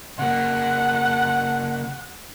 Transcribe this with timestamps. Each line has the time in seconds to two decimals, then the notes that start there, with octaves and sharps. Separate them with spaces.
0.19 C#3 A#3 F#5